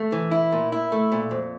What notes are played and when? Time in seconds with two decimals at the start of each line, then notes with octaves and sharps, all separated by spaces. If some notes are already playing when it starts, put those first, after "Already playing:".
Already playing: A3
0.12 E3
0.31 E4
0.52 A#2
0.72 E4
0.92 A3
1.12 A#2
1.31 F2